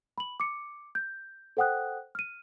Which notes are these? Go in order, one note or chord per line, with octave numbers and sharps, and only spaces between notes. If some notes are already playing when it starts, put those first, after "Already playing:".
B5 F#7
D6 C#7
G6
A4 C5 F#5 G5 D#6 F#6
F6 D#7